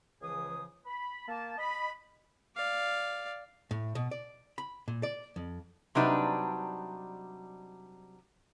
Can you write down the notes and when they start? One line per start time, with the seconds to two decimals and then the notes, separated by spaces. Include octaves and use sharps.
0.22 C#2 C#3 E3 F3 G#4 D#6
0.87 B5
1.28 A#3 A5
1.58 D#5 B5
2.56 D5 F5
3.71 A2
3.95 B2
4.11 D5
4.58 B5
4.88 A#2
5.03 D5
5.36 F2
5.95 C3 F#3 G3 D4 D#4 B4